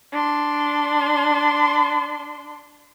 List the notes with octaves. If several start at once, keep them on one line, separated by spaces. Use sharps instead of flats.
D4 C6